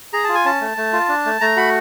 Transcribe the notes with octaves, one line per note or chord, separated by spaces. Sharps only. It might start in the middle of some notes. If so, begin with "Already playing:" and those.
G#4 A#5
A5
F4
G#5
C#4 A5
A3
A3
F4
D4
A3
A3 A#5
F#4 B5